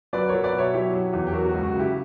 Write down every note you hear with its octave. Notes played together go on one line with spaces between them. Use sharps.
F#3 B4 D5
F#3 A#4 C#5
B4 D5
B2
C#5 E5
F#3 E4 G4
F#3
E2
G4
F#3 F#4 A#4
F#4
C#2
F#4
C#3
E4 G4